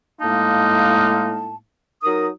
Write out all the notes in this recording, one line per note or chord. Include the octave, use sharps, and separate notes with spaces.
A2 G#3 A#3 D#4 F5 A5
F#3 D#4 A#4 D#6